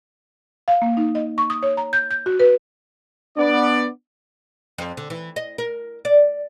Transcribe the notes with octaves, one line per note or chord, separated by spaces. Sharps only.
F5
A#3
D#4
D#5
C#6
D#6
C#5
A#5
G6
G6
F#4
B4
B3 D4 D5
F2
D3
E3
D#5
A#4
D5